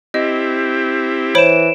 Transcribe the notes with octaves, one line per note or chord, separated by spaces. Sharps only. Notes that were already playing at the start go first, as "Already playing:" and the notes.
C4 E4 G4 D#5
E3 C5 C#5 B5 D7 E7